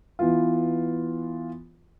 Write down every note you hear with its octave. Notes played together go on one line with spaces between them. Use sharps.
E3 B3 F4